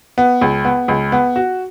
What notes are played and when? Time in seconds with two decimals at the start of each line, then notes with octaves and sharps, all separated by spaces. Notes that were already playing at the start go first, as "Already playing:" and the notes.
0.18 B3
0.41 C#2
0.65 B3
0.88 C#2
1.12 B3
1.36 F#4